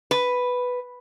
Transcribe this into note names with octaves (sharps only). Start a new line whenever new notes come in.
B4